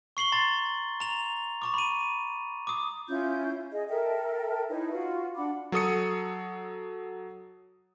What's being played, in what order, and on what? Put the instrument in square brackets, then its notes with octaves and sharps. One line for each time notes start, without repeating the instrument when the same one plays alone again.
[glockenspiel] C#6 C7 F#7 G7
A#5 C6 A6
A#5 F7
A#5 C#6 D6
B5 D#7
D6 D#6
[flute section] C#4 E4 F4 G6
G#4 D#5
A4 A#4 E5 G5
D#4 E4 B4 C#5
F4 F#4
D4 F#5 B5 D6
[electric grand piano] F#3 A4 D#6 C#7